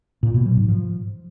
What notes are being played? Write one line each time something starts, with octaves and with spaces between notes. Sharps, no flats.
A#2
B2
F#3
G#2
F3